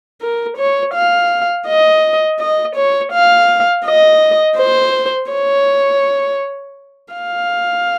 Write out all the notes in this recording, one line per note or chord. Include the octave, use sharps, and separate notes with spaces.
A#4
C#5
F5
D#5
D#5
C#5
F5
D#5
C5
C#5
F5